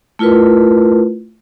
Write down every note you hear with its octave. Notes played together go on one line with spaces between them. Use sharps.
A3 E4 F4 A#4 B4